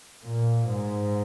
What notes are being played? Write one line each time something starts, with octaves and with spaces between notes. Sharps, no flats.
A#2
G#2